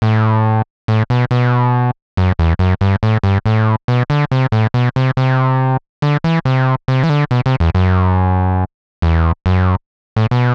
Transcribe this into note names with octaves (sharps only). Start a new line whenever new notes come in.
A2
A2
B2
B2
F#2
E2
F#2
G2
A2
G2
A2
B2
D3
C3
A2
B2
C3
C3
D3
E3
C3
C3
E3
D3
B2
C3
E2
F#2
E2
F#2
A2
B2